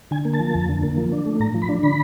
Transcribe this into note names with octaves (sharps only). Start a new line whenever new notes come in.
D3 G#5
A#3
A5
F3
F2
D3
A#3
F3
D4
A3
A2 A#5
F3
B5
D4
D3 B5